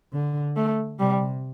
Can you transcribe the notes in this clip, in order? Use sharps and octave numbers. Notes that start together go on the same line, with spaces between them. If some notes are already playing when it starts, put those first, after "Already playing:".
D3
A3
C3 G3